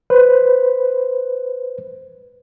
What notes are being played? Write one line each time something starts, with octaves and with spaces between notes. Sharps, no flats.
B4 C5